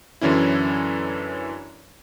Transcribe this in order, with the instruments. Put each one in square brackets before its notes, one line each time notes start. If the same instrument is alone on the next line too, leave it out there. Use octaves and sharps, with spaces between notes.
[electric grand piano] F#2 D3 E3 C#4 E4